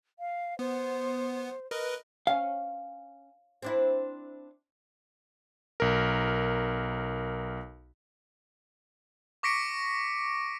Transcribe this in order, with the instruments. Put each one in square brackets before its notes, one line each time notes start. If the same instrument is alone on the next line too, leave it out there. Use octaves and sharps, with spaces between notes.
[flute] F5
[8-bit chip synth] B3 [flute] C5
[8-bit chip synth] A#4 B4 D#5
[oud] C#4 [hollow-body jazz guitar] F5
[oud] C4 D4 E4
[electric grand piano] B1 A#4
[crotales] C#6 D6 A#6 B6 C#7 D7